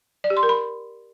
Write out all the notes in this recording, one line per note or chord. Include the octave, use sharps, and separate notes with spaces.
D5
G4
C6
A#4
B5